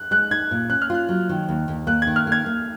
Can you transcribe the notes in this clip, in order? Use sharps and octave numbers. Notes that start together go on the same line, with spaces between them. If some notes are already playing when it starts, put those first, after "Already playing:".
Already playing: F#6
G#3 F#6
D#4 G#6
A#2
C#4 F#6
F6
F4 F#6
F#3
D#3
D#2
D#2
A#3 F#6
G#6
D#3
F6
A#3 G#6
A#3